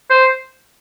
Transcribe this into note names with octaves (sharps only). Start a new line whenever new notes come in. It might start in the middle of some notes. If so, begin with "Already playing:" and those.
C5